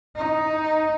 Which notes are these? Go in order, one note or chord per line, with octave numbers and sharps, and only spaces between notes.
D#4